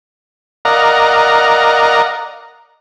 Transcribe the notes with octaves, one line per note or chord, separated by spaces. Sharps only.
A#4 D5 D#5 F5 F#5 A#5